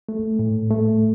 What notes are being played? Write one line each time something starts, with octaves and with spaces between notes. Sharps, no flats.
A3
A2
A3